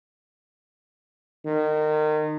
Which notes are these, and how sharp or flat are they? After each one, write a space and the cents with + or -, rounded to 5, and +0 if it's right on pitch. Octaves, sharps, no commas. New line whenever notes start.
D#3 -25